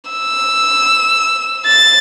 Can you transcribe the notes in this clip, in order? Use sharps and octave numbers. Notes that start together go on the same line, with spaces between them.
E6
A6